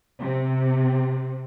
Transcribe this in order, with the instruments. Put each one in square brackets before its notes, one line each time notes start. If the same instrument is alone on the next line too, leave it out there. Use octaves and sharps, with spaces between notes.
[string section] C3